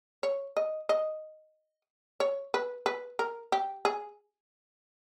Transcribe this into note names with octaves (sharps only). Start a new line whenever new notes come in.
C#5
D#5
D#5
C#5
B4
B4
A#4
G4
G#4